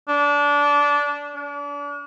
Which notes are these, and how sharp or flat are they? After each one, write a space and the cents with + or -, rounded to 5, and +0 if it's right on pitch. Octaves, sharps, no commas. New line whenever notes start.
D4 -20
D4 -35